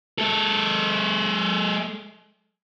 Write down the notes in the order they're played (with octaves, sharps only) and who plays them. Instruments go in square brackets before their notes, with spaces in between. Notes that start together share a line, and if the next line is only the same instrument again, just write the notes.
[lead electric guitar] G#3 A4